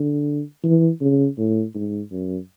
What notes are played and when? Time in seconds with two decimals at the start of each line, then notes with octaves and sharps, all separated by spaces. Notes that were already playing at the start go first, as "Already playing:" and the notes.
Already playing: D3
0.64 E3
1.01 C#3
1.38 A2
1.75 G#2
2.12 F#2